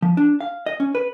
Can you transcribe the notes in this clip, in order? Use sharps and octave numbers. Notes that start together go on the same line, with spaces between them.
F3
D4
F5
D#5
C#4
B4